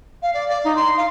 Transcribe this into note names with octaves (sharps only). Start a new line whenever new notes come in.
F5
D5
D5
D#4
C6
F5